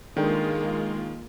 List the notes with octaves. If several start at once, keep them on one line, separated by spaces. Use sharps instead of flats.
D#3 G#3 A#3 D4 F4 A4 G5